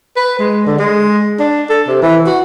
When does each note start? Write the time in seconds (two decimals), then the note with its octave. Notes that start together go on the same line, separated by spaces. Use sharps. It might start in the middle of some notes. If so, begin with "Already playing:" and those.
0.16 B4
0.39 G#3
0.66 D3
0.79 G#3
1.39 D4
1.70 A4
1.88 C3
2.02 E3
2.27 F#4